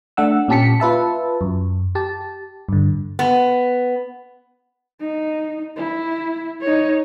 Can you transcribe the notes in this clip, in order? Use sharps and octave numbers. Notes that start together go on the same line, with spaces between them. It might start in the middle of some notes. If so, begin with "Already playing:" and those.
A3 D4 F#5 E6
A#2 C#4 G4 A5 B6 C#7
F4 B4 E5 A5
F#2
G4 A5
G2 D3
B3
D#4
E4
D#4 C#5